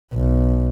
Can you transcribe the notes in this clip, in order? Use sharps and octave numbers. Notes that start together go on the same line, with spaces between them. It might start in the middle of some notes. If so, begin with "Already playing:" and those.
B1